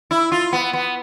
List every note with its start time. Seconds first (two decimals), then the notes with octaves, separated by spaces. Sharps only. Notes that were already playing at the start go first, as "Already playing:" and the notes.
0.11 E4
0.32 F4
0.53 B3
0.73 B3